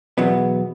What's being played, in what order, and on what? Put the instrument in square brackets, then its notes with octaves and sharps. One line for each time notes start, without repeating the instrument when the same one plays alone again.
[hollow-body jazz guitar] E2 B2 F#3 B3